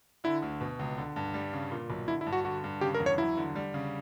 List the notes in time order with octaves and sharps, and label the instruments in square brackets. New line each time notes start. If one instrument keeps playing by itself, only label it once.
[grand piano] D3 [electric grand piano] E4
[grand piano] D2
B2
C#2
D3
G2
G3
C#3
A#2
B1
[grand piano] D3 [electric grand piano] E4
[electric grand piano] E4
[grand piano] G2
[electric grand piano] F#4
[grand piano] D3 [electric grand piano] F#4
[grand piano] G2
[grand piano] C#3 [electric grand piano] G4
[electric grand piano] A#4
[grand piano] E2
[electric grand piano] C#5
[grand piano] F#3 [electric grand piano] E4
[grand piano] D3
G3
C#3